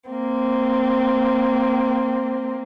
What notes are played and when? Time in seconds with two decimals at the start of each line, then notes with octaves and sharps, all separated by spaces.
0.10 A#3 C4